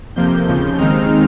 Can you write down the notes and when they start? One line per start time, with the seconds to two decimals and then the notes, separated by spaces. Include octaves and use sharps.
0.16 F2 C3 F3 A#3 G6
0.48 D#2 C#3 F3
0.78 D#2 D#3 G#3 C4 D#4 F6